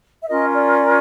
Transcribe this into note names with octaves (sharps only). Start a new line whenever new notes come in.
E5
C#4 F4 A#4 D#5
D5